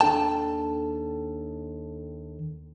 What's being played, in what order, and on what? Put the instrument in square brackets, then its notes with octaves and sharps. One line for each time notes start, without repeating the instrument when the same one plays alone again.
[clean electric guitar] D#2 D4 A4 G5 A5